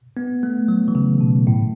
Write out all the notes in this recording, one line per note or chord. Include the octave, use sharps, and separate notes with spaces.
B3
A3
F#3
E3
C#3
B2
A2